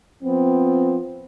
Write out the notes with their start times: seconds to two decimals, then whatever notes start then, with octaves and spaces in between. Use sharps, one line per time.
0.23 F3 B3 C4